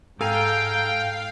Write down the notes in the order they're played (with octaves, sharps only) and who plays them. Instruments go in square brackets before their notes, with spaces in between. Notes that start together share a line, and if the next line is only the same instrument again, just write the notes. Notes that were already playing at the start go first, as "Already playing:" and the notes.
[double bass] G#2 [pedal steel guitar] A4 G#5 A#5 [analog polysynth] F5 [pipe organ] G5